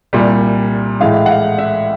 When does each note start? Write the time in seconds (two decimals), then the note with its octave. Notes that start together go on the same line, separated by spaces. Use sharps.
0.13 C2 A#2 G3
1.00 A2 E3 G#3 F5
1.26 F#5
1.30 F5
1.58 E5